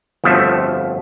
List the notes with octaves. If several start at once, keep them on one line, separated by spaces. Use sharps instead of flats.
G1 F2 B2 F3 A3 E5